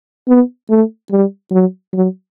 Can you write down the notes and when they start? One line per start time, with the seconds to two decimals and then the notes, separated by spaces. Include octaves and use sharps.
0.28 B3
0.70 A3
1.11 G3
1.52 F#3
1.93 F#3